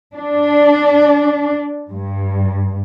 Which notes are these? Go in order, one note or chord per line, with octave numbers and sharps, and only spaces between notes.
D4
G2